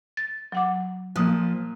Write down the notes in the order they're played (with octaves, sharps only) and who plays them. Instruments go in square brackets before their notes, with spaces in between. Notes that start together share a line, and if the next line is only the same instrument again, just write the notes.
[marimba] A6
F#3 F#5 D6
[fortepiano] A#2 D#6 F#6 [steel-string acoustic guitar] F3